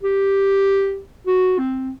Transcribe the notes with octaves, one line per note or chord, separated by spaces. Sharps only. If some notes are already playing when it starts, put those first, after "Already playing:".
G4
F#4
C4